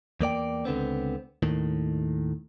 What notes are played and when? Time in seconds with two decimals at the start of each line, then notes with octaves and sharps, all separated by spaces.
0.21 E2 A#3 D5 G5
0.65 C#2 D3 B3 C4
1.43 D#2 A2 D#3